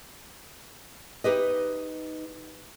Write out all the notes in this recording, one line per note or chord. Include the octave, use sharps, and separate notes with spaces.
D#4 G4 B4 D#5